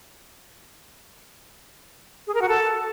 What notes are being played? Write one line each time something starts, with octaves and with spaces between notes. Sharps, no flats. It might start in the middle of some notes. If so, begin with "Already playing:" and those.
G#4
A#4
F#4
A4